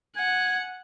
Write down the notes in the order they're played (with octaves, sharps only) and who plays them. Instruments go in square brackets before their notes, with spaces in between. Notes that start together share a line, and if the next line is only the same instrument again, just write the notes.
[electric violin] F#5 [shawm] G#5